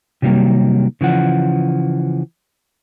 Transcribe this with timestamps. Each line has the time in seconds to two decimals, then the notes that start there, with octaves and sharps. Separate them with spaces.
0.22 C3 D#3 F#3 G3 A#3
1.01 C#3 E3 F3 F#5